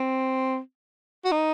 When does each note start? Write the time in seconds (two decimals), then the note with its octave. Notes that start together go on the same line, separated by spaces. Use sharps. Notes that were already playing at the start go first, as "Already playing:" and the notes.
Already playing: C4
1.25 F#4
1.31 D#4